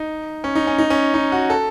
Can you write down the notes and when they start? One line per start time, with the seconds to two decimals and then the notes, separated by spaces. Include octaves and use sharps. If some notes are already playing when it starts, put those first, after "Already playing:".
Already playing: D#4
0.44 C#4
0.55 D#4
0.67 C#4
0.78 D#4
0.90 C#4
1.14 D#4
1.32 F#4
1.50 A4